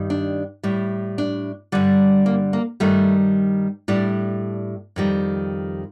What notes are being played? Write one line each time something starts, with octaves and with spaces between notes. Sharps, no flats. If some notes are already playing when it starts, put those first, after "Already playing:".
Already playing: G2 D#3 G3
D4
A2 G3
D4
G2 D3 G3
A#3
A#3
G2 D#3 G3 A3
A2 G3 D4
F2 D#3 G3